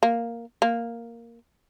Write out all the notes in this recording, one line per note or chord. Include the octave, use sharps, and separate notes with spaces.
A#3
A#3